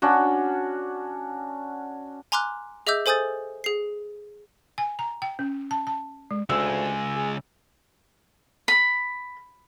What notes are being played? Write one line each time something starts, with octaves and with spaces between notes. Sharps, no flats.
C#4 D4 F#4
G#5 A#5 C6 D6 F6 F#6
G#4 D#5 E5 D6 E6 G6
A4 C5 G#5 D#6 G6 A6
G#4 C7
G#5
A#5
G5
C#4
A5
A5
G#3
D2 C#3 G#3 G#5 E6
G#4
B5